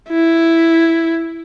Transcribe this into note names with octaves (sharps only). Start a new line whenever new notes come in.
E4